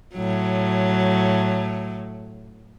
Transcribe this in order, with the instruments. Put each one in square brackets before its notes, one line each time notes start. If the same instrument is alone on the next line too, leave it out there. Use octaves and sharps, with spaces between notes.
[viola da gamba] A2 F#3